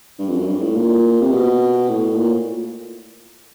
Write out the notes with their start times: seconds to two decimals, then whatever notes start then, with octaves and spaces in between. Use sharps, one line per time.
0.19 G2
0.29 F2
0.37 F#2
0.47 G2
0.61 A2
0.75 A#2
1.21 C3
1.32 B2
1.88 A2
2.16 A#2